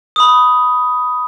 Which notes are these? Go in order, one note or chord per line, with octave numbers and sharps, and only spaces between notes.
B5 D#6